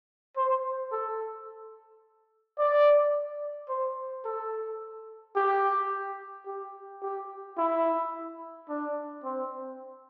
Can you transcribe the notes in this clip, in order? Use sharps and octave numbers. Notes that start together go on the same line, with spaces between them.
C5
A4
D5
C5
A4
G4
G4
G4
E4
D4
C4